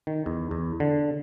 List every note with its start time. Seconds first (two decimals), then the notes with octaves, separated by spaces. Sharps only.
0.07 D#3
0.26 E2
0.51 E2
0.80 D3